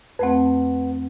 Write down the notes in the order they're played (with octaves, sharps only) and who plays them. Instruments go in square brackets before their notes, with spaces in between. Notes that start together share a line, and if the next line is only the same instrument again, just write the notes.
[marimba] F2 A3 C4 [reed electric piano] B4 F#5